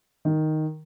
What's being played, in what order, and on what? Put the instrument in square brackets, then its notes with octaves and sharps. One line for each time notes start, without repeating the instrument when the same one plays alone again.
[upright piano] D#3